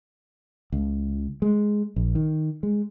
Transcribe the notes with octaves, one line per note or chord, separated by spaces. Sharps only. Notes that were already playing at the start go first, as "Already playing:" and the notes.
C#2
G#3
A#1
D#3
G#3